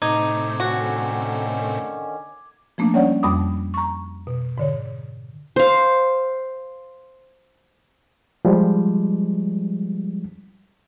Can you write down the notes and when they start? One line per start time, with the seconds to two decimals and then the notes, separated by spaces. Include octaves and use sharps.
0.02 A2 C3 D#4 D6 G#6
0.60 D3 D#3 C#4 F#4
2.78 F3 A3 A#3 C4 D4
2.94 G3 C#4 C#5 D5 F#5
3.23 F2 G3 B5 D6 D#6
3.74 A#5 C#6
4.27 B2
4.58 G#2 D3 C#5
5.56 C5 F5
8.45 F3 G3 G#3